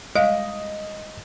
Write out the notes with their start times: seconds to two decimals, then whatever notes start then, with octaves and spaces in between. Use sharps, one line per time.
0.15 G3 G#3 D#5 F5